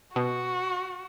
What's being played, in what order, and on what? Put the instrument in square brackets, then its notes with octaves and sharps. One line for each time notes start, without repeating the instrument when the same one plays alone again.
[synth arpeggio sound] B2 [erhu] F#4